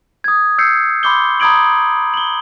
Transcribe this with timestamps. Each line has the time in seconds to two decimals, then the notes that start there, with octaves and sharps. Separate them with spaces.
0.24 D#6 G#6
0.58 E6 G6 C7 C#7
1.03 B5 C6 D6 G6 G7
1.40 A#5 B5 D#6 G#6 D7 F#7
2.14 F#7 G7